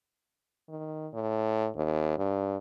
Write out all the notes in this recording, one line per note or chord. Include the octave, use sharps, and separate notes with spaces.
D#3
A2
D#2
G2